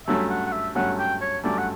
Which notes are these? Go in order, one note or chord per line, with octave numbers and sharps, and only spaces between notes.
G2 F#3 A3 C#4 E5
F#5
F#5
E5
G2 F#3 A3 C#4 F#5
G5
C#5
G2 F#3 A3 C#4 D5
F#5